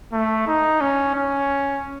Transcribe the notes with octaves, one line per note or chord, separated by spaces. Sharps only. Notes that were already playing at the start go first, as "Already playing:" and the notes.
A3
D#4
C#4
C#4